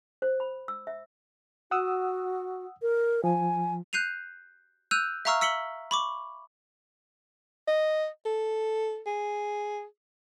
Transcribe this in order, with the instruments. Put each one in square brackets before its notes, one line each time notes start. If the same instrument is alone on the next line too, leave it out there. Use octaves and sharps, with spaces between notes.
[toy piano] C5
B5
E6
E5
[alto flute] F#4 [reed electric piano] F#5 D#6 E6
[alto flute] A#4
[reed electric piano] F3 [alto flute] G#5
[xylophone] F#6 G6 C7 D#7 F7
E6 F#6 G6 D#7 F7
E5 F5 A#5 C#6 E6 F6
E6 B6 C#7 F#7 G7
B5 C#6 D6
[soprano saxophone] D#5
A4
G#4